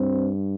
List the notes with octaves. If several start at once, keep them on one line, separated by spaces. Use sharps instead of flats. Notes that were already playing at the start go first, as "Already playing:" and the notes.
Already playing: G2 C4